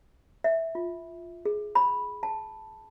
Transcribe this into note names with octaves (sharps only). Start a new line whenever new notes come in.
E5
F4
G#4
B5
A5